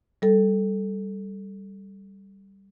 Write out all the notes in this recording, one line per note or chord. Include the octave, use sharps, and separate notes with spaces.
G3 A4